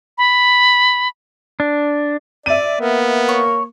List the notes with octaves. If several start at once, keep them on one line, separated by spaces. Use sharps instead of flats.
B5
D4
D5 E5 D#7
A#3 B3
C#5 C#6